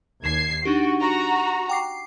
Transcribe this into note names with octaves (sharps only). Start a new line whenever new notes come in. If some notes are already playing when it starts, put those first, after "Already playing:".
D#2 G#6 C7 E7
D4 D#4 F#4 G4
F#4 A#5
G5 D6 C7